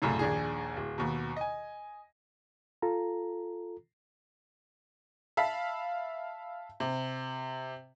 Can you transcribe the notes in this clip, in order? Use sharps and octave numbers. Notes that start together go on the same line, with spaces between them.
C2 F#2 A2 C#3
A#1 D#2 D4 G#4
D1
D#2 B2
D#5 G#5
F4 A4 A#5
E5 F5 A5 B5 B6
C3